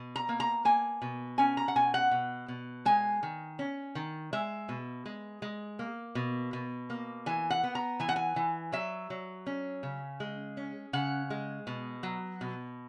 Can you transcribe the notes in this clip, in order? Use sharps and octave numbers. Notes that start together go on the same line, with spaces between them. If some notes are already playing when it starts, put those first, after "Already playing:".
Already playing: B2
A#5
A#3
A#5
A#3 G#5
B2
C#4 G#5
A#5
F#5
B2 G#5
F#5
B2
B2
G#3 G#5
D#3
C#4
D#3
G#3 E5
B2
G#3
G#3
A#3
B2
B2
A#3
E3 G#5
F#5
B3
A#5
E3 G#5
F#5
G#5
E3
F#3 E5
F#3
C#4
C#3
G#3
C#4
C#3 F#5
G#3
B2
F#3
B2